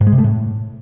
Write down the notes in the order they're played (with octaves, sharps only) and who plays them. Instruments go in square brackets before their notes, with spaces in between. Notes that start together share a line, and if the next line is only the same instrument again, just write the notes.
[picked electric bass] G#2
G#3
C3
A3
A2